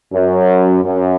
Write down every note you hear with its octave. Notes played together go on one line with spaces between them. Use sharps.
F#2
F#2